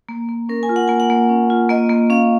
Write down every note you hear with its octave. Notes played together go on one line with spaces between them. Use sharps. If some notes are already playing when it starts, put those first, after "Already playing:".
A#3
A#3
C#4 A#4
G#5
F4
F#5
A#3 G#5
F#5
A#3
C#4
F4
A#3 D#5
A#3
C#4 F5